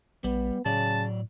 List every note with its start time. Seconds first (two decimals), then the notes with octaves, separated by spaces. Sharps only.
0.24 A#1 G3 B3
0.65 A2 C#3 F#3 D5 A5